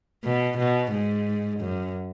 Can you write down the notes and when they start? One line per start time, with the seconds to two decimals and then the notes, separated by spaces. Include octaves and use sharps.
0.24 B2
0.58 B2
0.92 G#2
1.60 F#2